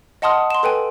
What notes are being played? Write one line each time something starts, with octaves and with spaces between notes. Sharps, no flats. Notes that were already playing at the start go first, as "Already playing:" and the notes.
D#5 F#5 A5 C6 D#6 F6
C6 E7
A4 B4 G5 G#5